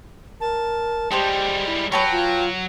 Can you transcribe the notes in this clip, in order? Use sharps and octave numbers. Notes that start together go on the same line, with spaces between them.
A#4 A5
G3 G#3 G4 C5 G5
E4
F#3 B4 C#5 G5 A5 C#6
F4